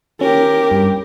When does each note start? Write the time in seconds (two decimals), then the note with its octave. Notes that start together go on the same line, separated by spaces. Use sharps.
0.21 C#4 G4 A#4
0.71 G2